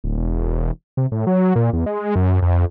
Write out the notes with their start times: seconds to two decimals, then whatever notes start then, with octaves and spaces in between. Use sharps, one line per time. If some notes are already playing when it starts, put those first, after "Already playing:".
0.04 D1
0.17 E1
0.97 C3
1.12 A2
1.27 F#3
1.56 A#2
1.73 E2
1.86 G#3
2.16 F#2
2.42 F2